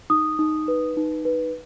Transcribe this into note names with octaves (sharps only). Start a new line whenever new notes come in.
D#4 D#6
D#4
B4
D#4
B4